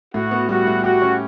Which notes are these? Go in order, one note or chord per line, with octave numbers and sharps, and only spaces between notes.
A2 F#4
B3
G3 F#4
A2
F#4 G4
C#4